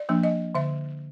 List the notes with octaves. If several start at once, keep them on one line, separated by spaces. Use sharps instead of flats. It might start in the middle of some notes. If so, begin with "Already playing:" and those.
Already playing: D5
F3 A#3 D4
D#5
D3 E5